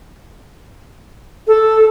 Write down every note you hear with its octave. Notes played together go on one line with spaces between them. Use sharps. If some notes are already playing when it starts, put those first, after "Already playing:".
A4